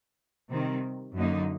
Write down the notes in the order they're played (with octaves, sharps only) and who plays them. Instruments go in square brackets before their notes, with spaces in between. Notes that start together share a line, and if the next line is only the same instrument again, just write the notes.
[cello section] C3 D#3 G3 C4
F#2 D3 F#3 A#3 D#4